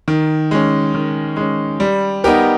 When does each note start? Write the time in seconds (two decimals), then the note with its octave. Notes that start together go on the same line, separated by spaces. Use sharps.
0.08 D#3
0.51 G#3 C#4
0.94 D#3
1.37 G#3 C#4
1.80 G3
2.24 B3 D#4 G4 A#4